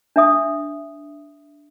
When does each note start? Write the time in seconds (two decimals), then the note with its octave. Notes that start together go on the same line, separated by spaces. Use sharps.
0.16 D4 E5 D#6